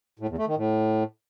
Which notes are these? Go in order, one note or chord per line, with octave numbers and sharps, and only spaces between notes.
A2
E2
A3
D#3
A2